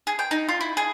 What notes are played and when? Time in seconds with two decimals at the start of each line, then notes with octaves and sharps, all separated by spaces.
0.07 G#4
0.19 G5
0.31 D#4
0.49 F4
0.61 E4
0.77 G#4